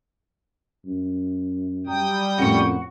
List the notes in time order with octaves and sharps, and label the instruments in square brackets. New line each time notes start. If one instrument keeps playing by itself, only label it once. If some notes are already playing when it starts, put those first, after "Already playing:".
[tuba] F#2
[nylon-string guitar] F#3 [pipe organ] G3 G5 D#6
[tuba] F2 [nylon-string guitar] A2 A#3 C#4 [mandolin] F#4 C#6